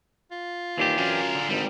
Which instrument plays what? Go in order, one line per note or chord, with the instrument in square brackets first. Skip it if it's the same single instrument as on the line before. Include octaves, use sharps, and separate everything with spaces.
[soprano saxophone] F4
[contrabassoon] D#2 [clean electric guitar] E3 D4 G4
[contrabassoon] F#2 [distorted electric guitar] G#4 A#4
[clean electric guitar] D3
[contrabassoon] G#1 [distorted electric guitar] G3 D#4